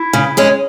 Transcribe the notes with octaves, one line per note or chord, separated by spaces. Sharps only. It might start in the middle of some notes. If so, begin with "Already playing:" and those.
Already playing: E4
C#3
G#3 C#4 G#4